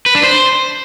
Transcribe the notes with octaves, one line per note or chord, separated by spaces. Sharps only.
B4
D4
C5